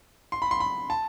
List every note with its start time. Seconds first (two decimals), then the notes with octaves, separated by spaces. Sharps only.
0.32 C6
0.42 B5
0.51 C6
0.60 B5
0.90 A5